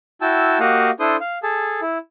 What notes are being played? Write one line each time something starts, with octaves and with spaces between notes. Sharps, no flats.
E4 F#4 G5 A5 E6
A#3 F#4 G4 D#5 F5 F#5
D4 E4 A4 C5 C6 D#6
F5
G#4 A4 A5
E4